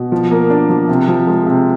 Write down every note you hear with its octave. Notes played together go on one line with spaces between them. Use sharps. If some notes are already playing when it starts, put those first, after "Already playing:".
Already playing: B2
F3
A#3
D4
F3
C3
F3
G#3
C3